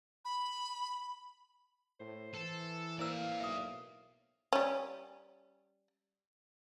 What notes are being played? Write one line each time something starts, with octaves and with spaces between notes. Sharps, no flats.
B5
A2 C5
E3 A4
A#3 E4 C5 D5 F5 E6
B1 E5 D#6
G3 C#4